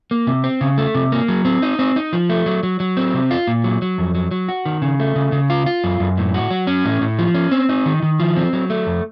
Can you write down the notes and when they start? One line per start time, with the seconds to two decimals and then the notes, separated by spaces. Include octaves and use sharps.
0.11 A#3
0.27 C3
0.44 C4
0.61 C#3
0.78 A3
0.95 C3
1.12 A#3
1.28 F#3
1.45 C4
1.62 D#4
1.79 C4
1.96 D#4
2.13 F3
2.30 A3
2.46 F#3
2.63 F#3
2.80 F#3
2.97 C4
3.14 C3
3.31 F4
3.47 A#2
3.64 F#3
3.82 F#3
3.98 F2
4.15 F#3
4.31 F#3
4.49 F#4
4.66 D#3
4.82 C#3
5.00 A3
5.16 C#3
5.32 C#3
5.50 F4
5.66 F4
5.84 F#2
6.00 F#2
6.17 A2
6.34 F#4
6.51 F#3
6.67 C#4
6.85 A2
7.01 A2
7.19 F3
7.34 C#4
7.51 C4
7.69 D#4
7.86 D#3
8.03 D#3
8.20 F3
8.36 C4
8.53 F#3
8.70 A3
8.87 F2